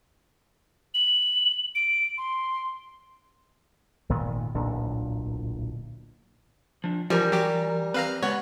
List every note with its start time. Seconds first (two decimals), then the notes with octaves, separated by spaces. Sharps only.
0.94 F#7
1.75 D7
2.18 C6
4.09 G#1 A#2 D#3 B3
4.54 D1 B1 A#2 D4
6.84 F3 D4
7.10 E3 F3 G3 A#4
7.32 F#3 G4
7.94 C4 B4 F5 A#5
8.23 G#3 B3 C#5 F#5